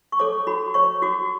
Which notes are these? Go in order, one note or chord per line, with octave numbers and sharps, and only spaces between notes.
C#6
A4 C#5 D6
F#4 B5
C#5 C#6
F#4 D6